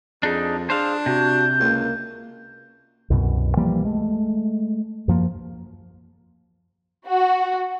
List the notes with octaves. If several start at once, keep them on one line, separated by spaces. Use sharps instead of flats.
F2 D4 D#4 G#4
D4 G#4 C5 F5
C3 F#4 G6
C#2 A#3
C2 F#2 B2
E3 F3 G3 A#3
G#3 A3
F#2 F3 A#3
F#4